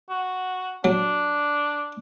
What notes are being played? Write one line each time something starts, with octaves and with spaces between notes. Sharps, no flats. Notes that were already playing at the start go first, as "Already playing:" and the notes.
F#4
F#3 D4